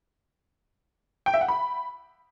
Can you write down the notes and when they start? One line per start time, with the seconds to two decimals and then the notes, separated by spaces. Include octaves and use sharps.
1.26 G5
1.34 E5
1.41 F#5
1.48 B5